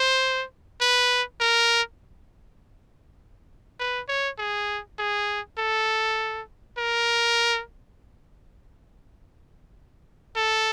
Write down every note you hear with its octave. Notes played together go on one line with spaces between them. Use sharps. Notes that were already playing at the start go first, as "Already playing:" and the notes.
Already playing: C5
B4
A#4
B4
C#5
G#4
G#4
A4
A#4
A4